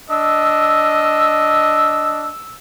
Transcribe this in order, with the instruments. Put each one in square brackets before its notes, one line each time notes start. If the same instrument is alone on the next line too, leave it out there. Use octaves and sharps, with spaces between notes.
[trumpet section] D4 D#5 [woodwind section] E6